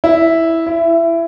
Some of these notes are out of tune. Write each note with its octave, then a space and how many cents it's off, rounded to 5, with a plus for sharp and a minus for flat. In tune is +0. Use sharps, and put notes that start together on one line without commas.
E4 -5
E4 +20